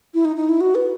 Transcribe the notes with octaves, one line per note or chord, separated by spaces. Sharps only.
E4
D#4
D#4
E4
F#4
B4